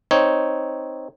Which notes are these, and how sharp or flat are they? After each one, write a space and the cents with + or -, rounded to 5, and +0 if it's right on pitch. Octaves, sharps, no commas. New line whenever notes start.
C4 +0 D#4 +0 C#5 +0